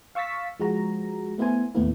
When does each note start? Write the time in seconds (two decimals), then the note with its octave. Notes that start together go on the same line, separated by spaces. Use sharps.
0.15 F5 C#6 E6 A6 B6
0.59 F3 G#3 F#4 A#5
1.38 A3 B3 E4 C5 G#5
1.75 D#2 A2 A3 B3 E4